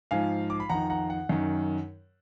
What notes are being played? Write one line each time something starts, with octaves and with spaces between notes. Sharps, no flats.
G#2 F3 F5 G#5
D6
B5
F2 D#3 F#5 A#5
F#5 A#5
F#5
F#2 D#3